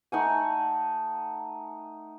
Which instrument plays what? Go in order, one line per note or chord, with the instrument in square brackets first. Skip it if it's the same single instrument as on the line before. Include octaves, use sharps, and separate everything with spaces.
[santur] A3 D#4 F#5 G#5